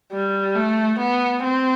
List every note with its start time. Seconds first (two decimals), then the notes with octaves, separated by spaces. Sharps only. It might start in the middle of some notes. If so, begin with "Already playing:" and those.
0.12 G3
0.55 A3
0.99 B3
1.44 C4